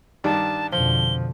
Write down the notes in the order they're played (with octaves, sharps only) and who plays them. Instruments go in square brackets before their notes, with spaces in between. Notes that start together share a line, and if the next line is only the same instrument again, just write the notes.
[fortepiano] G2 D#3 D4 [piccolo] A5
[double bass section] F2 B2 D3 [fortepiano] F3 [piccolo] G7